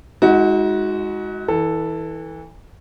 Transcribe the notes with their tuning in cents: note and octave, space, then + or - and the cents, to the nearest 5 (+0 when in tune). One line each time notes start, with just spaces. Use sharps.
G#3 +0 D#4 +45 F#4 +0
E3 -25 A4 +0